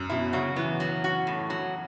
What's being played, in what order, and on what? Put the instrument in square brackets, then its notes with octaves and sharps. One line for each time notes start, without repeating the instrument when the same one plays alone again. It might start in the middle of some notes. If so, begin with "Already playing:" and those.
Already playing: [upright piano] F#2
[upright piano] B2 [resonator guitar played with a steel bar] E4
[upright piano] C#3 [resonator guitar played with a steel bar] F#3
[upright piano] E3 [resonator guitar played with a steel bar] B3
[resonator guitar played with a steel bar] F#3
F#4
A2
F#3